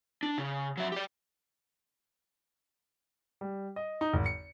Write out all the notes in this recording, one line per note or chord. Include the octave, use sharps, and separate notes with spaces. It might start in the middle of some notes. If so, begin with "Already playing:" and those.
D4
C#3
F#3 E5
G4 D5
G3
D#5
D#4
G#1
C#7